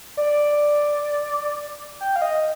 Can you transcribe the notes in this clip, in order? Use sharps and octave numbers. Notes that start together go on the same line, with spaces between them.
D5
G5
F5
D#5